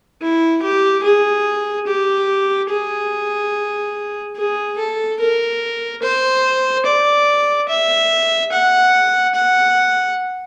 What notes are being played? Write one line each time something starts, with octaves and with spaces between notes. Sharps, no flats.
E4
G4
G#4
G4
G#4
G#4
A4
A#4
C5
D5
E5
F#5
F#5